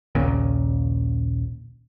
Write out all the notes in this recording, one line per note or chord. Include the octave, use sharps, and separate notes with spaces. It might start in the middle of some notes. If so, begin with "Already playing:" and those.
A#1 D#2 A#2 C#3